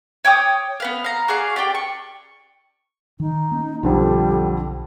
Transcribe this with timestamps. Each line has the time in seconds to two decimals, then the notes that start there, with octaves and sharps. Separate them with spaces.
0.25 C#5 G5 D6 D#6
0.80 B3 B4 F5
1.04 F5 A#5
1.28 F#4 G#4 D5 F5
1.56 G4 D5 G5
1.75 C#6
3.20 D#3 D#4
3.51 A#3 C#4
3.83 B1 F2 D3 F3 G3